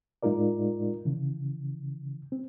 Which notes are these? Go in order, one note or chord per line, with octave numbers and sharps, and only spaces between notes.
A2 G#3 D#4 F4 A#4 D5
C#3 E3
C4